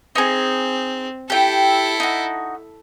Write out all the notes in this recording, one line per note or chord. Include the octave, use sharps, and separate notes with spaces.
C4 D#4 G#4
E4 G4 A4 G5
D#4 F#4